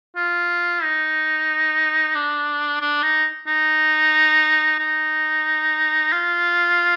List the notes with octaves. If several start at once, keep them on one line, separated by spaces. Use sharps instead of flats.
F4
D#4
D4
D4
D#4
D#4
D#4
F4